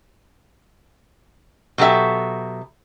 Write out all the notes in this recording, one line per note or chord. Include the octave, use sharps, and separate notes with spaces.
B2 F#3 G4 A4 E5